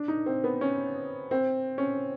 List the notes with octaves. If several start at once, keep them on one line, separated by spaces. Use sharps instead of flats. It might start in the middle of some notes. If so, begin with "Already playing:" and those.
Already playing: D4
D#4
C4
B3
C#4
C4
C#4